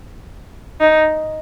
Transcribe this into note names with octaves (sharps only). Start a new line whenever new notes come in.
D#4